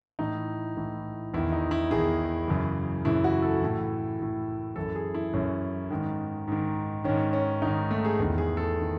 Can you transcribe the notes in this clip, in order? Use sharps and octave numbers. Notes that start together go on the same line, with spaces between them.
A2 E3 D#4
A2 E3
E2 D#3 E4
D#4
E4
E2 D#3 G#4
F#2 C#3 E3
F#2 C#3 E3 E4
F#4
A4
A2 E3
A2 E3
F#2 E3 A4
G#4
E4
F#2 E3 C#4
G#2 D#3
G#2 D#3
G#2 D#3 C#4
C#4
G#2 D#3 D#4
A3
G#4
E2 D#3
G#4
A4
D#3